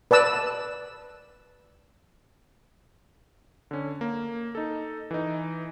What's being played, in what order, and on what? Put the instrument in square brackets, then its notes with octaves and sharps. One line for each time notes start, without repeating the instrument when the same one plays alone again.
[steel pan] B4 D5 A5 E6
[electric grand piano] D3 C#4
A#3
D#4 A4
E3 D#4